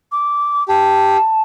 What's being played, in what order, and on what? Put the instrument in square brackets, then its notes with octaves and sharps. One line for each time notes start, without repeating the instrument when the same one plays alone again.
[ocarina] D6
[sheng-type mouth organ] G4 [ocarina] A5